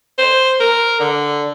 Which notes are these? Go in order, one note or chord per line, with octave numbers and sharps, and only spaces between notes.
C5
A#4
D3